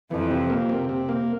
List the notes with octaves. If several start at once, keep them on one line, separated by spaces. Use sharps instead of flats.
F2 E3
C3
A#3
C3
C3
A#3